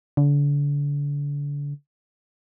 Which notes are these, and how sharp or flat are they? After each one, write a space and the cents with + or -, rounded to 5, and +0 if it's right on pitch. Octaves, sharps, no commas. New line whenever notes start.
D3 -35